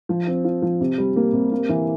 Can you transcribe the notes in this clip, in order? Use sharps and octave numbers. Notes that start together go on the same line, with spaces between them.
F3
C4
F4
F3
C3
G3
A#3
C3
A#3
E3